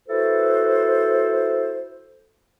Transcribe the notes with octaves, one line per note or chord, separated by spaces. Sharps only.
E4 F#4 A4 B4 C5